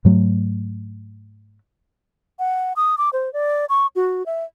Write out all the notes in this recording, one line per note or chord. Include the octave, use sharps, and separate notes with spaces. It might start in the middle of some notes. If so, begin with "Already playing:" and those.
G#2 F#3 A3
F#5
D#6
D6
C5
D5
C#6
F#4
E5